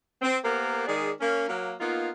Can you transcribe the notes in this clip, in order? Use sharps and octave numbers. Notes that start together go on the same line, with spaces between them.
C4
A#3 B3 G4 A#4 C5
D#3 G#3 G#4 D5
A#3 C#4
F#3 A#3
A#3 B3 D#4 F4